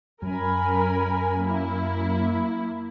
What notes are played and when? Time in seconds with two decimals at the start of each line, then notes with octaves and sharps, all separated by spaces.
0.22 F#2 A#4 G#5 B5
1.41 A#3 E4